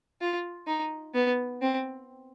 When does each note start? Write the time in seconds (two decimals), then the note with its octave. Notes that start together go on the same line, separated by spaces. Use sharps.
0.21 F4
0.67 D#4
1.14 B3
1.62 C4